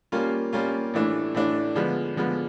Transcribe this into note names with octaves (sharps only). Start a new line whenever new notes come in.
G3 A#3 C#4 F4
G3 A#3 C#4 F4
A2 E3 A3 D4
A2 E3 A3 D4
D3 F3 G#3 B3
D3 F3 G#3 B3